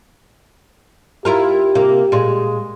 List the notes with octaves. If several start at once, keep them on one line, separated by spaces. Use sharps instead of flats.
E4 F4 G4 A#4
C3 A#3
A#2 G#3